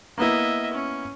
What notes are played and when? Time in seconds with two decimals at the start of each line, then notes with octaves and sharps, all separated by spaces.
0.18 A#3 B3 E4 D#5 E5
0.73 C#4